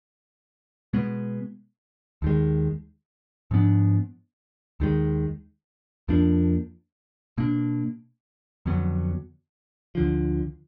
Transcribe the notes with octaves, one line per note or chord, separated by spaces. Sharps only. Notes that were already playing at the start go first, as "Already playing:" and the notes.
B2 G#3 B3
D#2 D#3 G#3
G#2 F3 B3 D4
D#2 D#3 G#3
F2 F3 A#3 D4
B2 A#3 D4
F2 D3 F#3 B3
D2 D3 F3